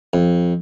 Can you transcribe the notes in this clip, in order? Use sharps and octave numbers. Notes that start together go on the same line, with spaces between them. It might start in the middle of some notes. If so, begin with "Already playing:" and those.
F2